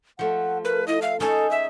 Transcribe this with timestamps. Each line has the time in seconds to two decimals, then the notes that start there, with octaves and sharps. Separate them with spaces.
0.19 F3 A3 F#5
0.65 A#4 B4
0.88 E4 D#5
1.02 E5 F5
1.20 C#4 D#4 G#4 A4 G#5
1.51 E5